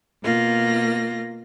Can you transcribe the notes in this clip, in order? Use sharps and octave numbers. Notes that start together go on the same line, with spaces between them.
B2 A#3 F4 A#6